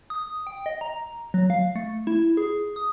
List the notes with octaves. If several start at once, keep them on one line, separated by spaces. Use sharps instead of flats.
D#6
G5
D#5
A#5
F#3
F5
A3
E4
G#4
D#6